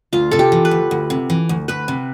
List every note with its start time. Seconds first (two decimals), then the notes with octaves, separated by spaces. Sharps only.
0.13 D2 F4
0.31 C3 A4
0.39 G4
0.52 E3
0.65 B4
0.71 D2
0.91 D2
1.10 C3
1.30 E3
1.49 D2
1.68 D2 B4
1.88 C3